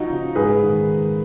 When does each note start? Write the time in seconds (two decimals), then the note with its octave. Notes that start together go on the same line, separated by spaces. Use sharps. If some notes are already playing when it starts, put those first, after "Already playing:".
Already playing: F3 D#4 F#4
0.10 C#3
0.35 G#2 G#4 B4
0.62 D#3